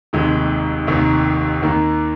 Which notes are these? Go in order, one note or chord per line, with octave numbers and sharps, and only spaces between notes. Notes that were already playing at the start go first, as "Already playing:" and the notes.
F1 D#2 D#3 G#3
F1 D#2 D#3
D#2 D#3 A#3